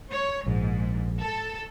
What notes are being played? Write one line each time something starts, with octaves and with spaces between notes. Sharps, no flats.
C#5
A#1 G#2
A4